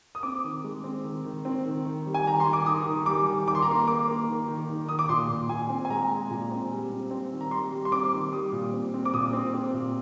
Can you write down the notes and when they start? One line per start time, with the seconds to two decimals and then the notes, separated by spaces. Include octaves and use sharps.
0.15 D#6
0.23 C4 D6
0.44 D#3
0.64 G#3
0.84 C4
1.04 D#3
1.25 D#3
1.45 C4
1.65 D#3
1.85 D#3
2.06 G3
2.14 G#5
2.26 D#3 A#5
2.40 C6
2.45 D#3
2.53 D6
2.66 D#3 D#6
2.86 D#3
3.06 G3 D6
3.27 D#3
3.47 D#3 D6
3.55 C6
3.62 A#5
3.67 A#3 C6
3.87 A#3 D6
4.08 A#3
4.28 D#3
4.48 D#3
4.69 D#3
4.88 D#3 D#6
4.99 D6
5.09 A#2 C6
5.29 A#2
5.49 A#2 G#5
5.69 C4
5.85 G#5
5.90 G#3 A#5
6.09 G#3
6.30 A#2
6.51 C4
6.71 G3
6.91 C4
7.11 C4
7.32 D#3
7.41 A#5
7.51 G3 C6
7.72 G3
7.85 C6
7.92 C4 D6
8.12 D#3
8.32 G3 D#6
8.52 A#2
8.73 C4
8.94 C4
9.05 D6
9.14 A#2 D#6
9.33 C4
9.54 C4
9.74 A#2